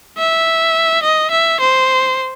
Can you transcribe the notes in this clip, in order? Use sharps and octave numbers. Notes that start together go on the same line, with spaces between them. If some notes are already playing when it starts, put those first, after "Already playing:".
E5
D#5
E5
C5